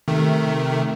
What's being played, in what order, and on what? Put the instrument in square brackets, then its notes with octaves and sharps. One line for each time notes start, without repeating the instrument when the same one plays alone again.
[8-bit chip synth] C3 D#3 A3